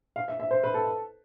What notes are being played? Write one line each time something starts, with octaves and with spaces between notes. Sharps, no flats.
F5
E5
E5
C5
B4
A4